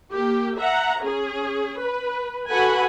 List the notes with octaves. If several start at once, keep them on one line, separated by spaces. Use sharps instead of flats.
A#3 G4
E5 F#5 A#5
C#4 G#4
B4
F#4 A4 B4 F#5 G#5 B5